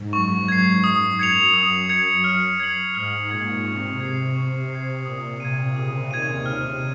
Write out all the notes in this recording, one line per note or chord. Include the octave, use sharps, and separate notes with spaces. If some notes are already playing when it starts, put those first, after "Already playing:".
Already playing: G#2
F#2 C#6
G#6 C7
D#6
F#2 G#6 C#7 F7
D#6
G#6 C#7 F7
F6
G#6 C7 F#7
G#2 F6
A#2 G#6 C7 F#7
C3 C#6
G#6 C7
C#6
G#6 C7
A#2 D#6
C3 G#6 D#7
C#3 D#6
D#2 D#3 G#6 D#7
C3 F6